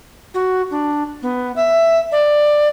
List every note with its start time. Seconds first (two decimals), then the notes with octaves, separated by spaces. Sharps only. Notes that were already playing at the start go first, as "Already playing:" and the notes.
0.34 F#4
0.71 D4
1.22 B3
1.56 E5
2.12 D5